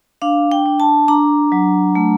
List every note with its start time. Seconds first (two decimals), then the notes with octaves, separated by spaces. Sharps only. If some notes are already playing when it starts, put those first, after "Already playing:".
0.22 D4 F5
0.52 G5
0.66 D4
0.80 A5
1.08 D4 A#5
1.52 F#3
1.95 A3